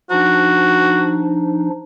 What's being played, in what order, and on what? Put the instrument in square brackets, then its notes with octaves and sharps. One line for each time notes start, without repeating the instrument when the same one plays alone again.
[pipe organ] F3 D4 D#4 [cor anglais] F#4